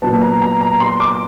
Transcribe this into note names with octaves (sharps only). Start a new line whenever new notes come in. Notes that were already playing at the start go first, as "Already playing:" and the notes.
A#2 F#3 B3 A5
A#5
A#5
A#5
C6
D6